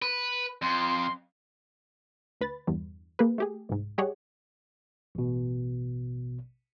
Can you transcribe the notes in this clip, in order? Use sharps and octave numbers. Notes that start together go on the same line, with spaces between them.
B4
F2 C6
D2 B4 B5 A6
E2 G2
A#3 G#4 B4
A3 G4 G#4
C2 G#2
G3 G4 G#4 C#5 D#5 F#5
A1 B2